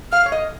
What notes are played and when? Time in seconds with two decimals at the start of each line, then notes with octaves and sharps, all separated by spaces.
0.12 F5 F6
0.26 C#5
0.32 D#5